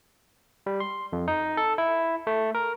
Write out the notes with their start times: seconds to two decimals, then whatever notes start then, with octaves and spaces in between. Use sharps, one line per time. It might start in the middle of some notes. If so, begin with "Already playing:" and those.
0.66 G3
0.80 C6
1.12 F2
1.28 D#4
1.57 A4
1.78 E4
2.27 A3
2.55 A#4